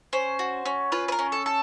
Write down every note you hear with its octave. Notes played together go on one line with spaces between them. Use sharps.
C#4 C5
F#4
C#4
F4 B4
B4
A#4
C#4
A4
A4